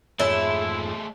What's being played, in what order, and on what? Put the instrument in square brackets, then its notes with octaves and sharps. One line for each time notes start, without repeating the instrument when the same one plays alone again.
[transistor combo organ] F2 G#2 [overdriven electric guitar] G#3 A3 [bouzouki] E4 [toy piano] C#5